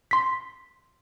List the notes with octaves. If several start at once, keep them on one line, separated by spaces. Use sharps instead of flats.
C6 B6